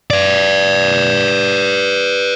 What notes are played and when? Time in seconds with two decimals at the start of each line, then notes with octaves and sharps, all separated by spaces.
0.10 B4 D5